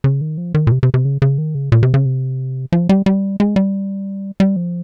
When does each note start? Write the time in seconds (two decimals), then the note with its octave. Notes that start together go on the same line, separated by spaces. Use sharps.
0.04 C#3
0.21 D#3
0.38 F3
0.54 D#3
0.67 A#2
0.72 C3
0.83 C3
0.94 C3
1.05 C#3
1.22 C#3
1.38 D#3
1.55 C#3
1.72 A#2
1.83 C3
1.94 C#3
2.05 C3
2.72 F3
2.89 G3
3.06 G3
3.40 G#3
3.56 G3
4.40 G3
4.56 F3